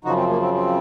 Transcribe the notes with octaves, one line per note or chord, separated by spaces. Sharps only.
F#2 C#3 F3 D#4 F#4
C4
A#3
C4
C4